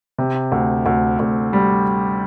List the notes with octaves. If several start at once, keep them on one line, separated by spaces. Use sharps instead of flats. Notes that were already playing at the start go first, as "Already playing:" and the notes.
C3
D2
D2
D2
G3